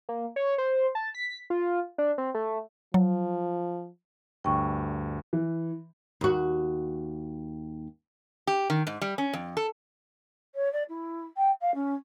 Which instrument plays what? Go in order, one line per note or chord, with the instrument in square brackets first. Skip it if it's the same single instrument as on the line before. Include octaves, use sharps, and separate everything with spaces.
[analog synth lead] A#3
C#5
C5
A5
B6
F4
D4
C4
A3
[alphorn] F3 [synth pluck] F#3
[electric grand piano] D2 G2 [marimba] G5 C#6
[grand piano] E3
[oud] D#2 F#4
[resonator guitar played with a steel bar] G4
D#3
G#2
G3
C#4
F2
A4
[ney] C#5
D5
E4
G5
F5
C#4